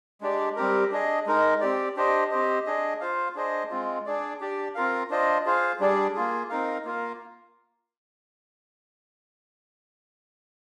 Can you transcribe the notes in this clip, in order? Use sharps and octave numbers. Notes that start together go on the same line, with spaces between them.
G#3 D4 G4 D5
G3 C4 G4 A#4
D4 G#4 D#5
G#3 D#4 A#4
C4 G4 D5
D4 G4 C5 D#5
C4 G4 C5 D#5
D4 G#4 D#5
F4 C5 F5
D4 G#4 C5 D#5
G#3 C4 F4
D4 G#4 D5
D4 G4 D5
C4 F4 A#4 F5
D4 F4 C5 D#5
F4 G#4 C5 F5
G3 D4 G#4 D5
A#3 F4 G#4
C4 D#4 A#4 F5
A#3 F4 A#4 F5